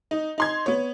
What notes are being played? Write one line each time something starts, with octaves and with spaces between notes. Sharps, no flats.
D#4
D#4 C6 G#6
B3 C#5